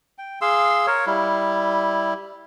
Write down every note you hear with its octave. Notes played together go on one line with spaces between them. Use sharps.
G5
G#4 F5 C6 E6
A#4 C#5
G3 E4